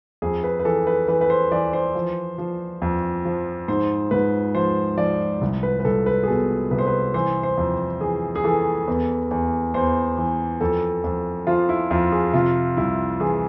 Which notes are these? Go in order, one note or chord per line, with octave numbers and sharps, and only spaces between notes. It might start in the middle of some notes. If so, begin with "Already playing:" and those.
F2 G#4
B4
B4
E3 A4
B4
E3 B4
B4
C5
E3 D5
C5
F3
F3
F2
F3
G#2 C5
G#2 B4
F3 C5
F3 D5
C2
B4
B4
C2 A4
B4
G#4
B2 A4
C2 B4
C5
B4
E3 C5
C5
F2
E3 G#4
G#4
E3 A4
E2
E2
E2 C5
E3
F2 A4
F2
F3 F4
E4
F2 F4
G#4
C3 F4
C2 E4
E3 G#4